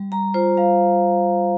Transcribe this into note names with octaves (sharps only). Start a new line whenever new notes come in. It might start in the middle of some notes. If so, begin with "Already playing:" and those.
Already playing: G3
G3 A#5
F4 C5
G3 F5